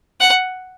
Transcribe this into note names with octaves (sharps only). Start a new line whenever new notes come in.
F#5